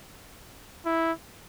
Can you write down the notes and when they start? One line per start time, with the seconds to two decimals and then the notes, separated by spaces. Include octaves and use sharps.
0.86 E4